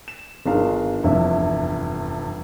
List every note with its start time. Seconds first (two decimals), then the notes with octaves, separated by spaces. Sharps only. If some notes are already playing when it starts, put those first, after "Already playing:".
0.08 E7
0.46 G1 D#3 D4 G#4 A#4 F5
1.03 F1 E2 G2 E4 E5